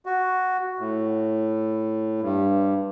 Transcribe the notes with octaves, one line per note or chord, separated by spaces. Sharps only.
F#4
A2
G2